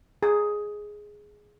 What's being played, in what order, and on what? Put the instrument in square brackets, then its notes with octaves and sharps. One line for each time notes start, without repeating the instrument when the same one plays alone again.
[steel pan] G#4